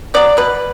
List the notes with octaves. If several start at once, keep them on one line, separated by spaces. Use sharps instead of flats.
F#3 B3 D5
B2 B4